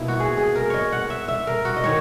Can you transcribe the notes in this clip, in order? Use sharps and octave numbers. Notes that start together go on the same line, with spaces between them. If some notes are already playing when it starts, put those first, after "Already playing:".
Already playing: B2 A#3 D#4 E4
F#4
G#4
G#4
A#4
C#5 D#5
F#5
E5
E5
A#4
F#4
D#5
D#3 C#5